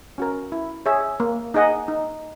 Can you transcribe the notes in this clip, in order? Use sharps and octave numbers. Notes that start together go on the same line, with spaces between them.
C#4 F#4 A#4
E4
G#4 C#5 E5
A#3
D#4 G#4 D#5 F#5
D#4